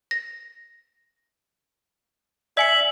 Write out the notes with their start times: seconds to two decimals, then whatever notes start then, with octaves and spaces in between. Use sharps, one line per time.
0.11 A#6
2.57 D5 E5 G#5 C#7 F#7